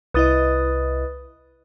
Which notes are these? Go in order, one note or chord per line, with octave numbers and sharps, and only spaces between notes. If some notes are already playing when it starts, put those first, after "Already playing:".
C2 E4 B4 D#5 D#6 A6